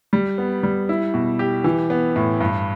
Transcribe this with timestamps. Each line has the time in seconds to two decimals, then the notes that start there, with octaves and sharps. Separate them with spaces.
0.13 G3
0.38 B3
0.63 G3
0.89 E4
1.14 B2
1.39 G4
1.64 E3
1.90 B3
2.16 A2
2.40 G2